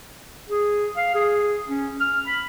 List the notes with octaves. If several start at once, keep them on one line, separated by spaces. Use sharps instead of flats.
G#4
F5
G#4
C#4
F6
B5